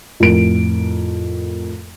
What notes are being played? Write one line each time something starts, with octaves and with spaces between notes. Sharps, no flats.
F2 A2 A#4 D7